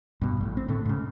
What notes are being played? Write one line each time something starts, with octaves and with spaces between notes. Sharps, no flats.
G2 B2
A1 A2
C4
A2 D3 A3
G#2 C#3